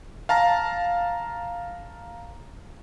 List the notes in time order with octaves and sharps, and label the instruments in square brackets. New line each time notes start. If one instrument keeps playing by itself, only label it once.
[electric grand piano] F5 A5 A#5